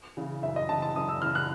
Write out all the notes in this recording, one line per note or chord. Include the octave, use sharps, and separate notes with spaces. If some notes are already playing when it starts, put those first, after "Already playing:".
C#3 E3
F#2 E5
D#5
C#3 E3 A5
A5
F#2 D#6
E6
C#3 E3 F6
F#6